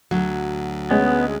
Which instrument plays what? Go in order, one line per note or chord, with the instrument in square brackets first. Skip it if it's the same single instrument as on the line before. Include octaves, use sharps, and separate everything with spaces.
[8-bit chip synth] D2 [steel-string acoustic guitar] F#3
[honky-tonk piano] G#3 C#4 [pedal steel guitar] B3